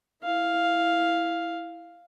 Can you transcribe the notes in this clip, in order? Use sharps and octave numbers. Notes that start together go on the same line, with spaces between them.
E4 F5